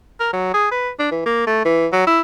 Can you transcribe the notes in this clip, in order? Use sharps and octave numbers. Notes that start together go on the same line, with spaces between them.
A#4
F#3
G#4
B4
D4
E3
A#3
A3
E3
F#3
E4